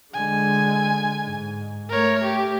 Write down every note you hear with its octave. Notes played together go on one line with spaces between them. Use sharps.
D3 G#3 G#5
G#2
A3 A#4 C#5
G4